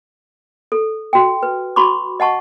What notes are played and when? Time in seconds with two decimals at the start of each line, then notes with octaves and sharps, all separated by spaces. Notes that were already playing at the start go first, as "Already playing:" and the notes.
0.72 A4
1.13 F#4 G5
1.43 B4
1.76 F#4 B5 C#6 D6
2.20 D#5 F#5 A5 C#6